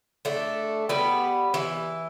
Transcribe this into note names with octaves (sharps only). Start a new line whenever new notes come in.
A3 D4
G3 B3
E3